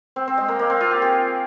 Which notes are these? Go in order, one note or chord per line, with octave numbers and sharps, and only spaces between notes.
C4
C4
G#3
A#3
A#3
C4
F4
G4
G#4